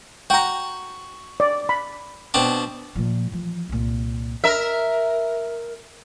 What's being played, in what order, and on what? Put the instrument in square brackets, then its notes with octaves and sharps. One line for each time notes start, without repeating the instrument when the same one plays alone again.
[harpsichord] F#4 F#5 [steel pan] G5 A#5
[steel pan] D5
B5
[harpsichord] B2 C4 D4
[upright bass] A#2 F3
E3 F3
C2 A#2
[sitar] A#4 E5